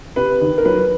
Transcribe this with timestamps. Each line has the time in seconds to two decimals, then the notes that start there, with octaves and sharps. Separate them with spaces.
0.16 C3 B4
0.41 D#3
0.58 A#4
0.65 F#3 B4